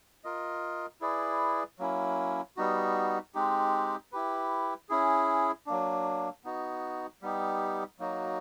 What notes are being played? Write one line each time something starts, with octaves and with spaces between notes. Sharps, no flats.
F4 A#4 D#5
E4 G#4 B4 D5
F#3 A#3 C#4 E4
G3 B3 D#4 F#4
G#3 C4 D#4 G4
E4 G4 B4
C#4 E4 G#4
F#3 A#3 D4
B3 D#4 F#4
G3 B3 D#4 G4
F#3 A#3 D#4 F#4